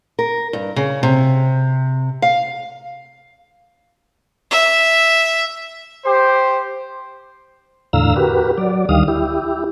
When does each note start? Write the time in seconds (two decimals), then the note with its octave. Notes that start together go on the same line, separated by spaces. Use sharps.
0.19 A#4
0.53 G2
0.76 C#3
1.03 C3
2.22 F5
4.51 E5
6.05 G4 C5
7.93 E2 A2 D3 F5 A#5 E6
8.16 F#4 G4 A#4 B4
8.58 F#3 D5
8.89 D2 D#3 G3 F5 D#6
9.08 E4 G4